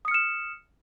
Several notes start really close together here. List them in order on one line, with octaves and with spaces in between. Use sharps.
D#6 C#7 F6 E7